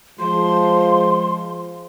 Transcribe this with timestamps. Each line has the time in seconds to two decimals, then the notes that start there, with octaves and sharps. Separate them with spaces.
0.20 F3 G#3 C6